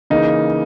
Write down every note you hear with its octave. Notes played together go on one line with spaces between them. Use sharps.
C#3 E3 A#3 D#4